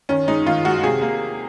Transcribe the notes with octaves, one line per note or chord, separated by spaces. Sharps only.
D#3 C#4
G#3 D#4
D#3 F4
G#3 F#4
C3 G#4
A#3